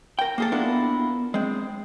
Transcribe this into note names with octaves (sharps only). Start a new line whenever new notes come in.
A#4 G5
A#3 G#4 A4
B3 D4 E4 F4 A4 A#4
G#3 C4